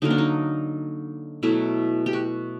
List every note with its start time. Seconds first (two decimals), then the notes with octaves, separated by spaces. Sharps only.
0.02 D3 F#3 A#3 D#4
0.10 D4
0.18 D#4
1.43 B2 F#3 A3 E4
2.06 G4
2.13 F#4